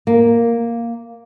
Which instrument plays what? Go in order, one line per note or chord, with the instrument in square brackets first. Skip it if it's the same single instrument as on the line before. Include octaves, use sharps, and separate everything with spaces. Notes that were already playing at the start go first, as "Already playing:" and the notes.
[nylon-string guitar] A#3